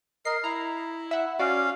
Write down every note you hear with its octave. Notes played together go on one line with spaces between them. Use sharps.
A#4 D#5 C7
E4 A#5
E5 F#5
C#4 F#4 D5 F5